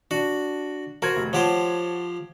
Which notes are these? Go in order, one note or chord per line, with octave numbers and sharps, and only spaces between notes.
D4 F#4
F#4 A#4 C5 G#6
F1
F3 G4 C5 C#5 F#5 A5